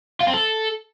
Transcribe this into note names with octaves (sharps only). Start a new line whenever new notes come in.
F4
C4
A4